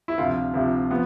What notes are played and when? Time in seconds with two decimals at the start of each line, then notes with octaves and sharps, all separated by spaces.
0.08 E4
0.18 D2 C3 F3 F4
0.54 D2 C3 F3
0.90 F3 B3